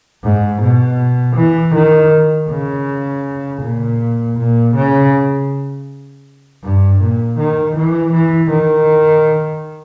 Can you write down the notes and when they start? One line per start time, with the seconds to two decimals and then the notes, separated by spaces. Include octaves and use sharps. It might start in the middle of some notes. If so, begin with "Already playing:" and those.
0.24 G#2
0.61 B2
1.36 E3
1.75 D#3
2.49 C#3
3.62 A#2
4.37 A#2
4.75 C#3
6.63 G2
7.00 A#2
7.39 D#3
7.76 E3
8.13 E3
8.50 D#3